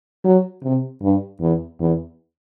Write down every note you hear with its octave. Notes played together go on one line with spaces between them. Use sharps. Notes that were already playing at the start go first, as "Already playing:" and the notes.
F#3
C3
G2
E2
E2